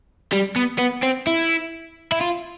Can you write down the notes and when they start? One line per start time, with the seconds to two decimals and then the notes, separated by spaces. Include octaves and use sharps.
0.32 G3
0.56 B3
0.79 B3
1.03 C4
1.27 E4
2.12 E4
2.21 F4